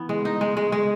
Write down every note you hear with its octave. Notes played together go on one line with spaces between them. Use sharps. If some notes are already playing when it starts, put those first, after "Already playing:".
Already playing: E3 B3
G#3
D#4
G#3
G#3
G#3